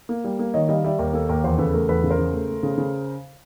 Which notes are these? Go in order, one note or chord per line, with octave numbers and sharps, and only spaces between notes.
A#3
G3
A#3
D#3 C#5 D#5
G3 D#5 F5
G3 D5 E5
D#2 A#4
A#3 A4
D#2 A#4
E2 A#4 C5
C#3 A4 B4
A3 A#4
E2 A4 B4
C#3
A#4 C5
C#3
A3
A3
C#3
C#3